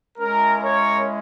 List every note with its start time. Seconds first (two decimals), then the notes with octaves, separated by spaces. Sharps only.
0.18 G#3 C#4 E4 A#4
0.61 A#4 C#5